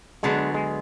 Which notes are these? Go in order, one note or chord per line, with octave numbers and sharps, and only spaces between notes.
D3 F#3 G#3 B3 D4 G#4
G#3